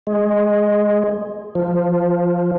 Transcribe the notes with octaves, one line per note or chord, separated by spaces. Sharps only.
G#3
F3